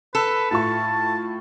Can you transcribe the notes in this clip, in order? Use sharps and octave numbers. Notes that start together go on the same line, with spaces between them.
A4 B4
A2 F4 A5 C#6